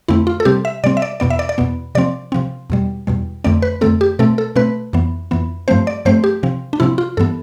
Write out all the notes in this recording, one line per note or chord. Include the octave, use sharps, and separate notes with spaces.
F2 D3 A3 C4 E4
F4
A4
C3 G3 C4 G4
E5
C3 G3 C4 D5
E5
D5
E2 B2 B3 D5
E5
D5
D5
E2 B2 B3
C3 F3 C4 D5
C3 F3 C4
E2 B2 G3
E2 B2 G3
F2 D3 A3 C4 D5
B4
F2 D3 A3 C4 A4
G4
B2 A3 C4 A4
A4
B2 A3 C4 B4
F2 E3 B3
F2 E3 B3
G2 F3 A3 C4 C5
D5
G2 F3 A3 C4 C5
G4
C3 F3 C4
D4
C3 F3 C4 E4
F4
G2 E3 B3 A4